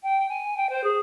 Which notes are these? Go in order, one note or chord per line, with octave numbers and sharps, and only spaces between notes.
G5
G#5
G5
C5
G#4